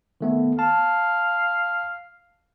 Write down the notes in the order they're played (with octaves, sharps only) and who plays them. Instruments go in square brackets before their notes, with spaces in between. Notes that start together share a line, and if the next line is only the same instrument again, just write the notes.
[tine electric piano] D#3 A3 B3
[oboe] F5 [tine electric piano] A5